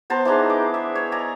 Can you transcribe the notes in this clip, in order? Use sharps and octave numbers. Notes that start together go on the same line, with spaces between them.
B3 C5 A5 A#5
E3 D4 D#4 G#4
D6
E5
C#5
D5 D#5 G#5 A#5